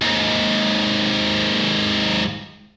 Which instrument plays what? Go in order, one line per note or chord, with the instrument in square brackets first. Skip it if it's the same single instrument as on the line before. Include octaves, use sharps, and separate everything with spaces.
[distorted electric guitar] D#2 G#2